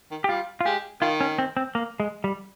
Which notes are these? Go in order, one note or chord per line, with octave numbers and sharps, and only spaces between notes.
D#3
G4
G3 F4
F4
G#3 G4
D#3 F4
C#4
C4
C4
A#3
G#3
G3